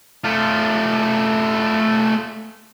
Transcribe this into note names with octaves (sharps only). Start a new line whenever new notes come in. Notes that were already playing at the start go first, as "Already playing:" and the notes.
A3 F4